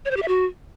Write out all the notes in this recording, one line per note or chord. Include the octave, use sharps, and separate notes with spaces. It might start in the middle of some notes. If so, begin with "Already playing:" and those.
C#5
C5
G4
E5
F#4